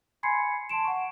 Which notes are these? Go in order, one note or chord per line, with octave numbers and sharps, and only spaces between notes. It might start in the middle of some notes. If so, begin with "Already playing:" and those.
G#5 B5 C6 G#6 C7 C#7
A5 C6 D7 E7
F#5 C#6